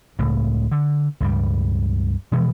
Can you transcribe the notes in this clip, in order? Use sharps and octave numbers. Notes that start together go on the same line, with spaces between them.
C#2 A2 C#3
D3
C#2 G2 G3
B2 E3 F3 G#3